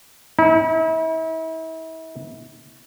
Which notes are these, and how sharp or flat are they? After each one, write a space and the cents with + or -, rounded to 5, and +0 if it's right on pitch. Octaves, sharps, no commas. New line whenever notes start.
E4 -40